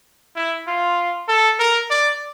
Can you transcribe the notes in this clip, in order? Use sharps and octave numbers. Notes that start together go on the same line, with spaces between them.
E4
F4
A4
A#4
D5